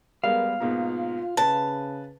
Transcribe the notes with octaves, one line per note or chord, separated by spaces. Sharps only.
G3 G#3 B3 A#4 F5
G#2 B2 A#3 F4
C#3 B4 A5